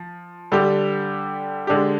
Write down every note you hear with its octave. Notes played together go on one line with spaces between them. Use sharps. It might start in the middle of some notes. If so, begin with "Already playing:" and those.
Already playing: F3
D3 G3 D4 G4
D3 G#3 D4 G4